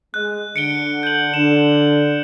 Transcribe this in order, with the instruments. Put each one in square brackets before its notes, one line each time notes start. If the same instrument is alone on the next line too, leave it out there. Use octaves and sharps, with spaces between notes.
[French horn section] G#3 [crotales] F#6
[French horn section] D3 [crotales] C#7 D7 G7
[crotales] G6 F#7
[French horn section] D3 [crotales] E7